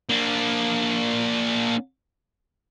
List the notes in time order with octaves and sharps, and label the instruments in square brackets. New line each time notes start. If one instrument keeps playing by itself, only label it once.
[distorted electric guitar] A#3 D4